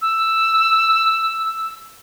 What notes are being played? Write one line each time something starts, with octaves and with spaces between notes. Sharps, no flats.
E6